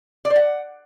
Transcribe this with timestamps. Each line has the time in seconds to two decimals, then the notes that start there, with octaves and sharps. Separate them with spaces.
0.25 D5
0.30 C5
0.36 F#5